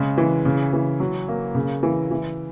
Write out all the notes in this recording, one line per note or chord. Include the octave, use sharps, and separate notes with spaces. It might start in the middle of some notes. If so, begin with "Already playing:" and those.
Already playing: C#3 G#3
E3
C#3
E3
F#3
A#3
C#3
E3
E3